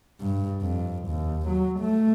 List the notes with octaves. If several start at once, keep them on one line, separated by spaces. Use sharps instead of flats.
G2
F2
D#2
F#3
A3